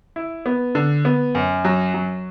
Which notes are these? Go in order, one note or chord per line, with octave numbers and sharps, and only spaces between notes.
E4
B3
D3
B3
F#2
F#3
F#3